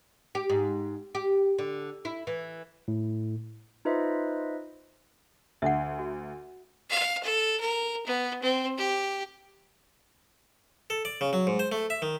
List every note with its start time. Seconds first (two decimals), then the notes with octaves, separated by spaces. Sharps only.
0.35 G4
0.50 G#2
1.15 G4
1.58 D3
2.05 E4
2.27 E3
2.88 A2
3.85 D#4 F4 B4 C5 D#5 E5
5.62 D2 E5 F#5
5.99 F#4
6.90 F5
7.24 A4
7.60 A#4
8.07 B3
8.42 C4
8.78 G4
10.90 A4
11.05 D5
11.21 C#3
11.33 F#3
11.47 G#2
11.59 C5
11.72 A3
11.90 E5
12.02 D#3